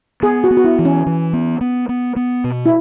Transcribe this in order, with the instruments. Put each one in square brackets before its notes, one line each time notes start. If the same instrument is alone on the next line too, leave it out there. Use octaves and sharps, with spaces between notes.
[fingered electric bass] B3 [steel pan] G#4
[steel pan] F#4
[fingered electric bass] B3
[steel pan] F#4
E4
[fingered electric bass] E3
[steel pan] C#4
[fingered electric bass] E3
B3
B3
B3
B3
B2
[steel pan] E4